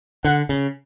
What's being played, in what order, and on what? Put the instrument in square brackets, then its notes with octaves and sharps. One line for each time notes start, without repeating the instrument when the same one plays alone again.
[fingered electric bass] D3 [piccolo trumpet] F#5
[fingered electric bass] C#3